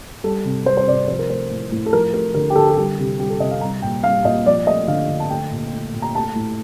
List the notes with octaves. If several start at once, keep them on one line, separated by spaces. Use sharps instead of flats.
G3 A4
C3
G3 C5
C5
C3 D5
F3 C5
A#4
A3 C5
A2
A2
A4
F3 A#4
A3 A#4
D3 A#4
G4
D3 A4
A4
G3 G4
C3 G4
G3 G4
A4
C3 D#5
F5
G3 A#5
A#2 G5
G3 F5
A#2 D#5
F3 D5
A3 D#5
D3 F5
D3
A5
A3 G5
A#2
A3
A#2
A#5
A3 A5
A2